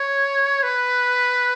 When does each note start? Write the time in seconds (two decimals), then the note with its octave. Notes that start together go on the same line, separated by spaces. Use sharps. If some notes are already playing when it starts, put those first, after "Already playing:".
Already playing: C#5
0.63 B4